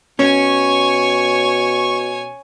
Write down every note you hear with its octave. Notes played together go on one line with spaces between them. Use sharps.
B2 C#4 C#5 G#5 C#6